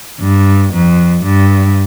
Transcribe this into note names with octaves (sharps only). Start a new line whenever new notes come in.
G2
F2
G2